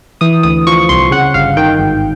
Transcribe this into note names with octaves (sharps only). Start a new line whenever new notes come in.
E3 D#6
D2 D#6
F3 C#6
C2 C6
C#3 F#5
G1 F5
D#3 G5
G#1